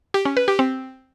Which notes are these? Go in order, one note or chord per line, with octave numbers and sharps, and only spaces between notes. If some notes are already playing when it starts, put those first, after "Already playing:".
G4
C#4
B4
G4
C4